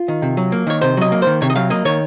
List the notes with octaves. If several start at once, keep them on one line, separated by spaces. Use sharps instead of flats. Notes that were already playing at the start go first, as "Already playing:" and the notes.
Already playing: F4
D#3
C3
F#3
A#3
D#3 C#5
C3 C5
F#3 D#5
A#3
D#3 C5
C3 C#5
D#5
F#3 F5
A#3 D#5
D#3 C#5